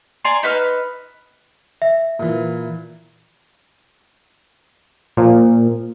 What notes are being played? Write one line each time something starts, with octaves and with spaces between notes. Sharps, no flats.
D5 G#5 A#5 C6
D#4 B4 E6 F6
E5
A#2 E3
A#2 F3